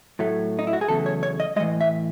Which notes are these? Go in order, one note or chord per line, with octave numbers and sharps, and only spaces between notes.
A2 F#3 A3
D#4
E4
F#4
G#4
E2 C#3 F#3 A3 A4
C#5
C#5
D#5
G#3 D#5
A2 E3
E5